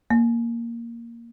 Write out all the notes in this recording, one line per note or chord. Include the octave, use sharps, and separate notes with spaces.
A#3